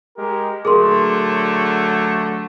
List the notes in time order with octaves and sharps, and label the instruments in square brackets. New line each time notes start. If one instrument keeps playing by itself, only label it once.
[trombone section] G#3 G4 A#4
[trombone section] D3 F#3 A3 [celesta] G#4 A#4 C6